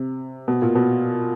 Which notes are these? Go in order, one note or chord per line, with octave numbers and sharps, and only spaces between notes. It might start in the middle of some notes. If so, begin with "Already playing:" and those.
Already playing: C3
B2
A#2
B2